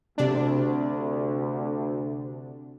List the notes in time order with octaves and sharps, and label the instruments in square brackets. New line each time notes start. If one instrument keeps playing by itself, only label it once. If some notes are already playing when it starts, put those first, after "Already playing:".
[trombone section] D2 [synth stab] C3 D4